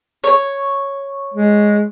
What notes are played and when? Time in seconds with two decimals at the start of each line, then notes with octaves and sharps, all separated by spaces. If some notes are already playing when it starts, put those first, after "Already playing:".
0.24 C#5
1.34 G#3